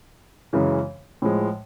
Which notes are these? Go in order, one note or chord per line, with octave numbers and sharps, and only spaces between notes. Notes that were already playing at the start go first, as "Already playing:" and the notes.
F#2 C#3 E3 G#3
A2 F3 G#3